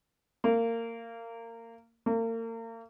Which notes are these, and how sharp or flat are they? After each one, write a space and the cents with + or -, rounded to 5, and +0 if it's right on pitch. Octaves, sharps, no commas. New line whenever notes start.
A#3 -25
A#3 -40